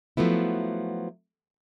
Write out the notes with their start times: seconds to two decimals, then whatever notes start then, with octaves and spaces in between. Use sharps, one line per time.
0.17 F3 F#3 A3 B3 E4